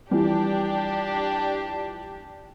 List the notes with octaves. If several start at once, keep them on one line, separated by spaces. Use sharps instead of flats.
E3 F3 G3 D4 G4